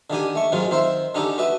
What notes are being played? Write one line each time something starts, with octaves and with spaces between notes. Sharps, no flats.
D3 D#3 G4 G#5
A3 C#6
G#2 D#3 F#3 C#4 F4
D#3 C4 C5 E5
D3 C#4 D#4 G4 A4
F#4 B4 D#5 E5